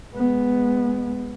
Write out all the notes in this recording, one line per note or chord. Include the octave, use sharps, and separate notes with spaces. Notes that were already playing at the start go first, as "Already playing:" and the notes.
G#3 B3